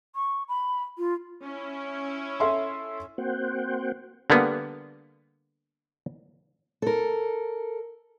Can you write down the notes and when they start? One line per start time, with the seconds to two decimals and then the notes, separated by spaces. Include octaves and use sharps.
0.16 C#6
0.49 B5
0.98 F4
1.44 C#4 E4
2.40 A4 E5 C6
3.18 A#3 C4 F#4 C5 F#5 G5
4.30 D3 G3 A#3 B3
6.82 A4 A#4